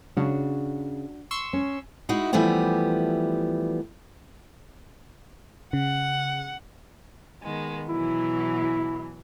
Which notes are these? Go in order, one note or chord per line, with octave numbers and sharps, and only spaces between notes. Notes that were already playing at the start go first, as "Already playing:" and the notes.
C#3 D4 F#4
C6 C#6 E6
C#4
G#3 D#4 E4 F#4
E3 F3 G3 A3 B3 G4
C#3 F#5
D#3 G#3 B3
B2 E3 F#3 E4